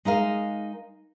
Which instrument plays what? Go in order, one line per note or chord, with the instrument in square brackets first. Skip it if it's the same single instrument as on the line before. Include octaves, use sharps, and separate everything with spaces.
[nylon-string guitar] G#3 D#4 A#4 F5